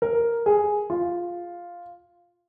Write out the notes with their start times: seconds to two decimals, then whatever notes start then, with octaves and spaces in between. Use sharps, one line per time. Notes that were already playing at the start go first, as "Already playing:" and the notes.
0.02 A#4
0.46 G#4
0.90 F4